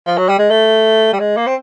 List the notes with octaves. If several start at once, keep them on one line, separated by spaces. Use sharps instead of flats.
F3
F#3
G3
G#3
A3
G3
G#3
A#3
C4